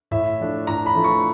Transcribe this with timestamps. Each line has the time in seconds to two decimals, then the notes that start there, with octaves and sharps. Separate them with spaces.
0.11 A2 E5
0.40 F3 A3 D4
0.67 A2 A#5
0.86 B5
0.95 F3 A3 D4
1.04 C#6